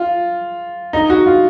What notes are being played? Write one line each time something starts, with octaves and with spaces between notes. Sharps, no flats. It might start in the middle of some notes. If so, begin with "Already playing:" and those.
Already playing: F4
D#4
F#4
F4